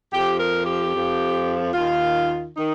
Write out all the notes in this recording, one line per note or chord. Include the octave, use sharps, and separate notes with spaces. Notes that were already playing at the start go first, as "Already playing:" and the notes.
F2 F3 G4
A#4
G4
F2 F3
D#2 D#3 F4
D#3 D#4